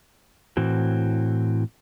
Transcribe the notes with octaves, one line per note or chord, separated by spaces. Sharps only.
A2 E3 C4 F#4